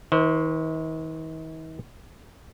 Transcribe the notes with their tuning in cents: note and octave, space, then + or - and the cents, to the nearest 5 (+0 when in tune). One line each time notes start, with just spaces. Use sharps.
D#3 +45 C5 +0